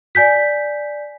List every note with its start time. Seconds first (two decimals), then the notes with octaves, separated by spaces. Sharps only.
0.15 D5 G#5 G6 B6